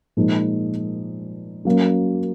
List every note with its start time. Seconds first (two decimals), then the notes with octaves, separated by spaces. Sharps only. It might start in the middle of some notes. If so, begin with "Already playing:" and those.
0.17 A#2 F3 G#3 D#4
1.65 F#3 A#3 C#4